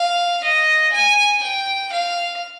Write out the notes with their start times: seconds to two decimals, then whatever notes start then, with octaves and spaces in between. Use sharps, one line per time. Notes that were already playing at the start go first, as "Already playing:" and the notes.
Already playing: F5
0.44 D#5
0.93 G#5
1.43 G5
1.92 F5